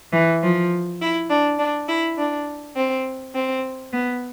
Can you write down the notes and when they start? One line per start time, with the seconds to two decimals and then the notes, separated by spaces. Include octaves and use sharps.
0.12 E3
0.43 F3
1.01 E4
1.29 D4
1.58 D4
1.89 E4
2.17 D4
2.76 C4
3.34 C4
3.92 B3